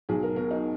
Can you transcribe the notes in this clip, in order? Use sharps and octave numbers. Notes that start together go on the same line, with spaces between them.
B1 G#4
A#4
B2 A#4
D#4